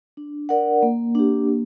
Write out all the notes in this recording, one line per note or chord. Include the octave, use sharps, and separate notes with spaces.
D4
A#4 D5 F#5
A#3
D4 G4
A#3